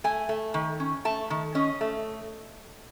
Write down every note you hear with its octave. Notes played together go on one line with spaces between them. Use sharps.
A3 G#5
A3
D#3
C#4
A3 A5
D#3
C#4 D#5
A3